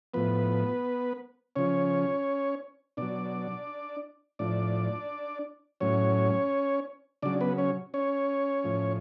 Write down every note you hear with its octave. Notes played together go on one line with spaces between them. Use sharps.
A2 F3 B3 B4
C#3 F3 C#4 C#5
B2 F#3 D4 D5
A2 F3 D4 D5
A2 F#3 C#4 C#5
C#3 F#3 D4 D5
B3 B4
C#4 C#5
C#4 C#5
A2 F3